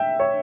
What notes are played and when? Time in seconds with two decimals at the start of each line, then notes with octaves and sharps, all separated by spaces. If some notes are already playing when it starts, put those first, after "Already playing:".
Already playing: E5 G5
0.20 C#5